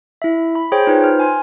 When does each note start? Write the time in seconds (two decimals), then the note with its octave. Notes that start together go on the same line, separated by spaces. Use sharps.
0.22 E4 E5
0.55 B5
0.72 G#4 C5 C#5 G5
0.87 D#4 F4 B4 C5
1.04 F6
1.20 G#5 C6